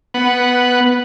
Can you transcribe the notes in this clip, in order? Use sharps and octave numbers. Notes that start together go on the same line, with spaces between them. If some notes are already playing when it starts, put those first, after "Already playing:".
B3 F#5